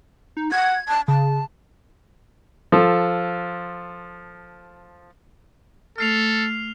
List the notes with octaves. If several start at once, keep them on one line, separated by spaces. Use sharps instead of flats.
D#4
F#5 G#6
A5
C#3 A5
F3 A4
A3 A4 F6 C7 F7